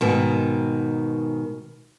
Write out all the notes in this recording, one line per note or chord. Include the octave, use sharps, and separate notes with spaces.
G#2 B2 D#3